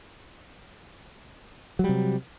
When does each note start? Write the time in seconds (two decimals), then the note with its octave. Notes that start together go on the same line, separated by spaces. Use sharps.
1.79 F#3
1.84 G3
1.89 C3